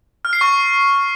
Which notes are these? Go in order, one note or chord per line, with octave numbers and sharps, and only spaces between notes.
F6
C7
C#6